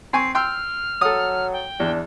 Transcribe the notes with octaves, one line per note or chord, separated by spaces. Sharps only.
C4 G#5 C#6 C7
G5 C6 E6 F6
F#3 A4 D#6
G5
E2 D4